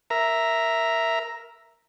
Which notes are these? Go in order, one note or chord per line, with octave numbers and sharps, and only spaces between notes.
A#4 E5 A#5